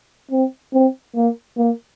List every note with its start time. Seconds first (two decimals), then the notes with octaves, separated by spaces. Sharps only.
0.31 C4
0.74 C4
1.16 A#3
1.58 A#3